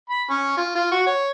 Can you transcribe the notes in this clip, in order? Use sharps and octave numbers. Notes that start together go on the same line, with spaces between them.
B5
C#4
F4
F4
F#4
C#5